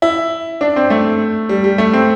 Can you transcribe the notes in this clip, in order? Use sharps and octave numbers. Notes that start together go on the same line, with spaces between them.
E4
D4
C4
A3
G3
G3
A3
C4